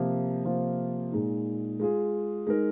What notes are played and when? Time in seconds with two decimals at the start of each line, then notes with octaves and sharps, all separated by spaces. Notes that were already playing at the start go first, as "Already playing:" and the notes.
Already playing: C3 F3 A#3
0.45 C3 F3 A#3 F4
1.12 A#2 G#3 D#4
1.80 G#3 F4 G#4
2.47 G#3 D#4 A#4